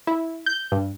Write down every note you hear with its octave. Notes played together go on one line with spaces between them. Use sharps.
E4
G6
G2